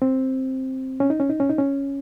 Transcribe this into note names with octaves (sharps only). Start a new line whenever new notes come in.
C4
C#4
D#4
C#4
D#4
C#4
D#4
C#4